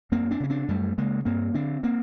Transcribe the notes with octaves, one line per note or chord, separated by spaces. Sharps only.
F#2 A#3 C4
C4 D4
C#3 C#4
C4 D4
F#2 G3 A3
C#3 G#3 A#3
G2 A#3 C4
D3 C4 D4
A#3 C4